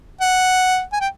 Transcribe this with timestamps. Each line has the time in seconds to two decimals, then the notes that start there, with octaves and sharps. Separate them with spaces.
0.21 F#5
0.93 G#5
1.00 G5